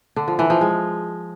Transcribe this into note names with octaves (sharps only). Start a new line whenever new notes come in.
D3
F3
E3
F3
G#3